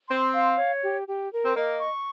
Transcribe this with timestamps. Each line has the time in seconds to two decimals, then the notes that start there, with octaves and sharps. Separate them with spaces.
0.09 C4 C6
0.33 F5
0.57 C#5
0.82 G4
1.07 G4
1.32 A#4
1.44 C4
1.56 A#3 D#5
1.80 C#6